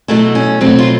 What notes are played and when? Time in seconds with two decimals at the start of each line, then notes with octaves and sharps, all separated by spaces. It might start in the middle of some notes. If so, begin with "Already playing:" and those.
0.08 B2 F#3 A3 E4
0.35 C#4
0.61 B2 F#3 A3 C4
0.79 F4